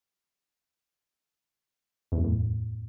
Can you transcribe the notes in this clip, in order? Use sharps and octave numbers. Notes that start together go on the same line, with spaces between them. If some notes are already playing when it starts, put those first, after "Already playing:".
E2
F#2
A2